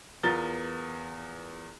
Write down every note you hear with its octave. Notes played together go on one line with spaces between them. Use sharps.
E2 B3 F4 A#4 A6 G7